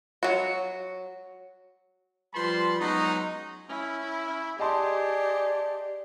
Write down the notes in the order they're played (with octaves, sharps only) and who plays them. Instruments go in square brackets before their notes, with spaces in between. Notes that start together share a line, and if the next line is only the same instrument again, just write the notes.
[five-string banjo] F#3 F#4
[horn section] F3 G3 B4 A5 B5 C6
F#3 G#3 B3 C#4 D#4
[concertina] C#4 [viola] E4
[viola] G4 [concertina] G#4 [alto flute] D5 [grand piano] D#5 A5 C6